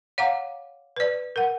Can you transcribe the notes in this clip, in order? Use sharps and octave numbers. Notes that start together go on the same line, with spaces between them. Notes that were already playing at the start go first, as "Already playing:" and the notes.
C#5 F5 F#5 A#5 D6
B4 D5
A#4 F#5